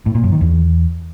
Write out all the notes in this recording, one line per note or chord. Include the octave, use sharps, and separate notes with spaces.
A2
A#2
F#2
D#3
E2